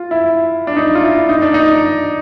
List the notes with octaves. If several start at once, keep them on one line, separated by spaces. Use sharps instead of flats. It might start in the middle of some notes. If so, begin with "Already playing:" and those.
Already playing: F4
E4
D4
D#4
F4
E4
D#4
D4
D#4